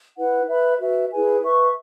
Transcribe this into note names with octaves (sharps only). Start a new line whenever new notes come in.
E4 B4 F#5
B4 E5 B5
F#4 B4 E5
E4 G#4 B4 G#5
B4 E5 C#6